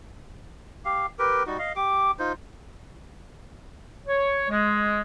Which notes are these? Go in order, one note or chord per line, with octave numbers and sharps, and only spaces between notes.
G4 F5
G4 A#4 B4 G5
G3 D#4 F#4
D#5 F5
G4 D6
D#4 F4 C5
C#5
G#3